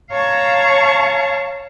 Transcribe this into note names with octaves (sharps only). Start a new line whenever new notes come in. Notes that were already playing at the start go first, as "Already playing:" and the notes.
C#5 F5 A5 A#5 C#6